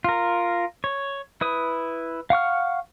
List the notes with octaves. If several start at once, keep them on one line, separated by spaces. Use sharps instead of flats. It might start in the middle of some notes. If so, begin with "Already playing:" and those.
F4 A#4
C#5
E4 B4 D#6
F5 F#5 C#6 F6